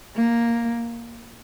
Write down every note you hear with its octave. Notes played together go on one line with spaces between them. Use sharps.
A#3